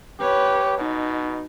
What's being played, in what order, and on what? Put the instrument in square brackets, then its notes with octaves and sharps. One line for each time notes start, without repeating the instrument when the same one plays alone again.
[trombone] G4 [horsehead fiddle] B4 C#5
[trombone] B2 [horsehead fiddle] D#4